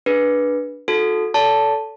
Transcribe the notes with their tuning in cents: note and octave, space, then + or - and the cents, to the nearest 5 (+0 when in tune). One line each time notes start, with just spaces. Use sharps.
D4 +0 G#4 +0 B4 -15
D#4 +0 F#4 -30 A4 -10
A4 +0 D5 -45 A5 +0